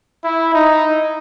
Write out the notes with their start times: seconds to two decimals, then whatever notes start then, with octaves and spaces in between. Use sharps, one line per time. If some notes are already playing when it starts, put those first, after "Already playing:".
0.24 E4
0.53 D#4